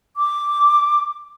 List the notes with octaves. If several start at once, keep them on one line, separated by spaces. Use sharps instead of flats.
D6